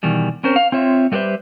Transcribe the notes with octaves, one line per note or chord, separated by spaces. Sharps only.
B2 D#3 E3 G3
C4 C#4 A#4 C5
F5
C4 F4 C#5 E5
G3 A3 G4 B4 C5 E5